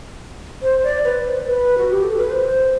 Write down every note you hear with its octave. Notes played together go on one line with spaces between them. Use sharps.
C5
D5
B4
C5
B4
F#4
G4
A4
B4
C5